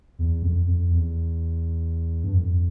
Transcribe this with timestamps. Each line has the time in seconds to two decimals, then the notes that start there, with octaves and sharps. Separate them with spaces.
0.19 E2
0.43 F2
0.67 F2
0.91 E2
2.24 G2
2.34 F2